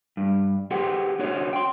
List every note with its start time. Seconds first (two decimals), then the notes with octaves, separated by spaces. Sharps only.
0.17 G2
0.71 G4 G#4 B4 C5 F#5 G5
1.19 C#4 D4 F#4 G#4 C5 C#5
1.53 G5 C6